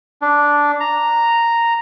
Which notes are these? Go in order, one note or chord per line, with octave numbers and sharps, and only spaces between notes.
D4
A#5